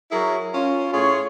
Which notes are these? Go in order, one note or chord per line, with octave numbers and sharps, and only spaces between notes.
F#3 E4 G#4 A#4 C#5
C#4 F4
A2 F4 G#4 C#5